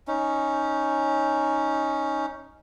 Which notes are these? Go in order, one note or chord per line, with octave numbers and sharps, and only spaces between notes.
C#4 D#4